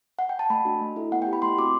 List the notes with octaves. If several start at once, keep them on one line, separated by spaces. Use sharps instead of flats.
F#5
G5
A5
A3 B5
D4 F#4
A3
E4 A4
B3 F#5
G5
E4 G4
B5
A3 C6
C4 F#4 D6